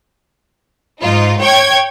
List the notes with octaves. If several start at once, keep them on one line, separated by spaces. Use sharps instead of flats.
G#2 D#4 F4
C#5 G5 G#6